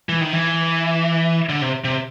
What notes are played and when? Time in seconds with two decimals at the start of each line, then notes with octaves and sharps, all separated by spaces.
0.09 E3
0.21 D#3
0.33 E3
1.49 D3
1.61 C3
1.84 C3